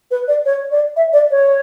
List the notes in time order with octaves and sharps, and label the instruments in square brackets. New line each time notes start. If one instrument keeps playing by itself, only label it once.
[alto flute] B4
D5
C#5
D5
E5
D5
C#5